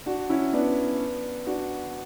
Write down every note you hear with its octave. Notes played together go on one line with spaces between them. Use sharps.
D4 F#4
C#4 E4
B3 D4
D4 F#4